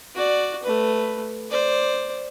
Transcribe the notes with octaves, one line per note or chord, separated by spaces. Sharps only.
F#4 D5
A3 B4
C5 D5